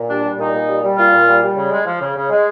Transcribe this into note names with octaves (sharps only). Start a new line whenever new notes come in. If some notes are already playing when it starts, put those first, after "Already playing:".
Already playing: A#2
G3 D4
G3
A#2 D#4
A#2
G3
G3
A#2 F4
A#2
G3
G3
C#3
G#3
F3
C#3
C#3
G#3